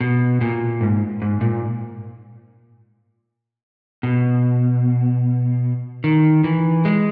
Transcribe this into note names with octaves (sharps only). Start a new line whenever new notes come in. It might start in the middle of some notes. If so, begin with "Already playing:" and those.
B2
A#2
G#2
G#2
A#2
B2
D#3
E3
G#3